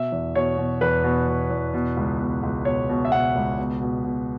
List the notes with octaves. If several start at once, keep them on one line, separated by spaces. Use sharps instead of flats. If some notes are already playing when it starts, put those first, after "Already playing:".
Already playing: B2 E5
E2
B2 C#5
B2
E2 B4
B2
B2
E2
B2
C#2
B2
C#2
B2 C#5
B2
E5
B2 F#5
C#2
B2
B2
B2